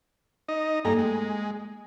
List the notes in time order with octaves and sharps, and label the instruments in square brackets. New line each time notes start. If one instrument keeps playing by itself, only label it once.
[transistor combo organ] D#4 D#5
[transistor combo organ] G2 A#5 [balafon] A#3 A4 G5
[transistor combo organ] G#3 [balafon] A3